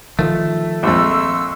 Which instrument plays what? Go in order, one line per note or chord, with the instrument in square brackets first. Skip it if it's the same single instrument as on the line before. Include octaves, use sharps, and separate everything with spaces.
[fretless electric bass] D#3 F3 [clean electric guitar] A3
[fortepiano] A#1 F2 [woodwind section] C6 C#6 E6